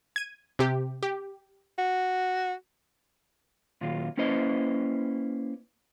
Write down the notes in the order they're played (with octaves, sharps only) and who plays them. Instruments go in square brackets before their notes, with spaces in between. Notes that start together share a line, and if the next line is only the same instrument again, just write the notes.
[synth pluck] G#6 D#7
C3 G4
G4
[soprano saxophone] F#4
[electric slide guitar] A#2 D#3 F#3 F4
A#3 C#4 E4 B4 C5 D#5